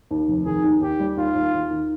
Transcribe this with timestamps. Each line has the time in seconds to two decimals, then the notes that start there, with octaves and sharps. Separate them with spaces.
0.11 D#2
0.28 F1
0.46 D#3 G#4
0.64 D#2
0.81 D#2 G4
1.00 G3
1.17 D#2 F4
1.35 D#2
1.54 D#2
1.70 D#3